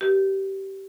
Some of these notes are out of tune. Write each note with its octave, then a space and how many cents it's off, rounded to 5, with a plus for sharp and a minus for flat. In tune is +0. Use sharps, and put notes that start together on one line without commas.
G4 -20 A#4 +45